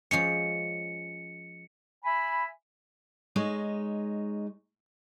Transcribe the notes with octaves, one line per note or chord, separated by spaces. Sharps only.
F3 G#3 C#4 C#7
E5 G#5 B5
G#3 D#4 C#5